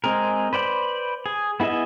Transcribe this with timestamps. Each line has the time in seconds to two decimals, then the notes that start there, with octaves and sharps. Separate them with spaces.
0.04 G#3 C4 G#4 A#4
0.53 B4 C5 D5 F#5 B5
1.26 G#4
1.60 B3 E4 G#4 D#5 E5